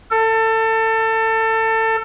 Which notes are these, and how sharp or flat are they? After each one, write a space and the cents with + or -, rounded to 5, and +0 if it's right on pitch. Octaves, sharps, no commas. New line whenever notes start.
A4 +25